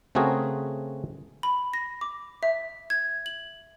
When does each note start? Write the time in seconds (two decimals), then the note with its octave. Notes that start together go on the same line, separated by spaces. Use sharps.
0.15 C#3 A3 C4 F#4 G#4 A#4
1.43 B5
1.73 A#6
2.01 D6
2.43 E5
2.90 G#6
3.26 F#7